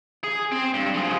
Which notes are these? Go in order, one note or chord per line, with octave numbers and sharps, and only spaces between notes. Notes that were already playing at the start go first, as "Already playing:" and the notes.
G#4
C4
G2
F3 G#3